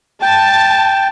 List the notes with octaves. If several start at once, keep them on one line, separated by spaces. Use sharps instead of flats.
G5 A5